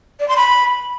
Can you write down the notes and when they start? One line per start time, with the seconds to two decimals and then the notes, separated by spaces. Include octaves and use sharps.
0.20 D5
0.28 C6
0.37 B5